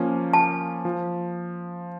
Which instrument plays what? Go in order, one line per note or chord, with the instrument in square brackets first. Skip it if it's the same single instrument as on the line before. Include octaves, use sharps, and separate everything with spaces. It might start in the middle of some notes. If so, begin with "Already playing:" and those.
Already playing: [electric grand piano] F3 A#3 C#4
[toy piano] A5
[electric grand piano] F3